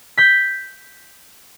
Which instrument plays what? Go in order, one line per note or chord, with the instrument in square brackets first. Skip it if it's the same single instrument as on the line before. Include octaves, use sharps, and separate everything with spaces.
[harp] G6 B6